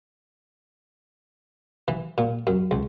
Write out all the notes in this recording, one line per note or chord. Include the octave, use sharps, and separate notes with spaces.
E3
A#2
F#2
C#2